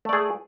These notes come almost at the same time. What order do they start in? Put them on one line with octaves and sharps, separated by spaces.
A3 D5 G#4